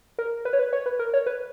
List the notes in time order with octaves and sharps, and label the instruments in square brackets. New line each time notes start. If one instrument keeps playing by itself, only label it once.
[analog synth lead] A#4
B4
C#5
B4
C#5
B4
A#4
C#5
B4